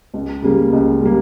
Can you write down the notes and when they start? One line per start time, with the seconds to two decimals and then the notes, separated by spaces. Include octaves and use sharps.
0.14 C#2
0.42 C#3 G3 A#3
0.73 C#2
1.00 C#3 G3 A#3